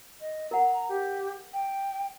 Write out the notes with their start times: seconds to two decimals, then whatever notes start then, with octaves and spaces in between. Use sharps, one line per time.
0.21 D#5
0.51 A#4 F#5 A#5
0.89 G4
1.53 G5